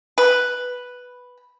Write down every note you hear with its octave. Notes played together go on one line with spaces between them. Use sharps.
B4